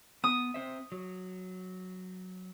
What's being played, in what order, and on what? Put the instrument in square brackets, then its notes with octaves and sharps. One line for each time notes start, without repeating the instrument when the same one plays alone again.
[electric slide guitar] B3 [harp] D#6
[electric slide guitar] C4 C5 E5
F#3